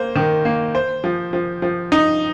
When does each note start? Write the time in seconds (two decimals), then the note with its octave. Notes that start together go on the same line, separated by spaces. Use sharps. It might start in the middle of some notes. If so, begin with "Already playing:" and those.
Already playing: A#3 C5
0.16 D#3
0.45 A#3
0.75 C5
1.04 F3
1.33 F3
1.62 F3
1.92 D#4